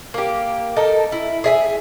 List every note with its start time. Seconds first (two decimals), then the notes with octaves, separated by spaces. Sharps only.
0.14 A#3 G4
0.77 D#4 A4 A#4
1.12 E4
1.44 G#4 E5 G#5